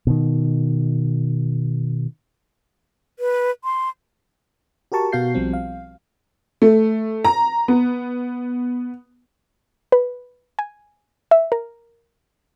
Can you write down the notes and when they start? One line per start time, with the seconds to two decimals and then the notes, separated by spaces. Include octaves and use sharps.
0.07 B2 D#3
3.19 B4
3.64 C6
4.92 F#4 G4 A#4 A5 C#6
5.12 B2 B3 F#4 F5 G6 C7
5.35 B1 F3 G3 C4
5.53 F5
6.62 A3
7.25 A#5
7.68 B3
9.92 B4
10.59 G#5
11.31 E5
11.52 A#4